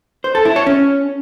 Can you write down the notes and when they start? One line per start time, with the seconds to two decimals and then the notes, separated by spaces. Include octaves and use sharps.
0.24 C5
0.35 A4
0.45 E4
0.56 C#5
0.66 C#4